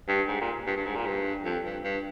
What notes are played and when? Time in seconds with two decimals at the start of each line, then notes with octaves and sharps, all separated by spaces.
0.08 G2
0.28 G#2
0.41 A#2
0.66 G2
0.77 G2
0.86 G#2
0.96 A#2
1.06 G2
1.45 F2
1.65 G2
1.84 G2